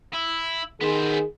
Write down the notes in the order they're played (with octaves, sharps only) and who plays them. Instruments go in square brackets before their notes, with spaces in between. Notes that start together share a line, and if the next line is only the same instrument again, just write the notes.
[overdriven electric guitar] E4
[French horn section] D#3 G#4 [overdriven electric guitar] B3 C5